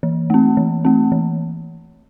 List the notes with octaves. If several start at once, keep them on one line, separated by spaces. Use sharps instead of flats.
E3
A3 C4
E3
A3 C4
E3